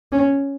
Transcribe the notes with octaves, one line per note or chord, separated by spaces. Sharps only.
C#4